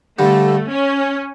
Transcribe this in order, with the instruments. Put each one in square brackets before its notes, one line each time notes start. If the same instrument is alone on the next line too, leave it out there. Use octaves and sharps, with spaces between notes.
[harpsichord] G2 D3 G3 [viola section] A3
[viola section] C#4